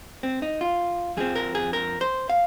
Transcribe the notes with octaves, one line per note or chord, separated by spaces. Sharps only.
C4
D#4
F4
F2 F3 C4 G#4
A#4
G#4
A#4
C5
F5